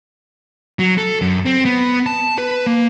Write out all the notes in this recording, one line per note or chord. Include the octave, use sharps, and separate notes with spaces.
F#3
A4
F#2
C4
B3
A5
B4
A#3